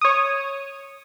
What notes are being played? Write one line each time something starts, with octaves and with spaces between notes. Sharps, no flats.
C#5 D#6